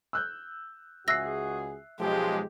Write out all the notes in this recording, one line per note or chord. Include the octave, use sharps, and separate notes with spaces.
E6 F#6 G6
C#2 F#4 G#4 E5 E6 F#6 A#6 C7
B1 F3 G#3 G4